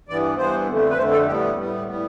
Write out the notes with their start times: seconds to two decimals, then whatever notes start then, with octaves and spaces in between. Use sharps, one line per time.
0.08 G2 E3 B3 D5
0.38 G2 E3 B3 C5
0.67 F2 D3 A3
0.90 B4
0.97 F2 D3 A3 C5
1.12 A4
1.27 A2 G3 B3 G4
1.58 A2 G3 B3
1.87 A2 G3 B3